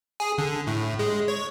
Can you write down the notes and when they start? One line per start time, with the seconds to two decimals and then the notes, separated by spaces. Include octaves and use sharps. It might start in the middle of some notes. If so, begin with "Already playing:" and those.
0.20 G#4
0.38 D3
0.67 A2
0.99 G#3
1.28 C#5